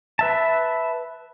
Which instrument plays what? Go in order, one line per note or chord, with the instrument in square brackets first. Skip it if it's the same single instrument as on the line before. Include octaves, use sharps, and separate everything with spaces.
[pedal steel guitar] B4 E5 A5